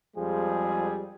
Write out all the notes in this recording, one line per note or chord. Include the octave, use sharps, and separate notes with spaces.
F2 F3 G3 G#3 G#4